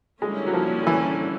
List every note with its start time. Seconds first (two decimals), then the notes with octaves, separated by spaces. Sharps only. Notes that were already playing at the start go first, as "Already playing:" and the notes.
0.22 D3 G3 G#3 A#3 C#4 E4
0.47 F#3
0.54 F3
0.87 E3